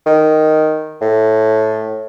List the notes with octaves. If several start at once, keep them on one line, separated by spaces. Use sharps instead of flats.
D#3
A2